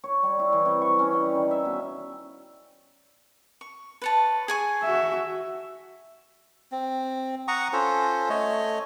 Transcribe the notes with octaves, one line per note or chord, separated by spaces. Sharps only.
C#5
G3
E4
E3
C3
C#6
C#4
G3
D#3
E5
B2
C#6
B4 C#5 A5
G#4 G#5 C#6
F#4 E5
C4
F#5 A#5 C#6 D#6
C#4 F4 A4 C5
A3 C#5 D#5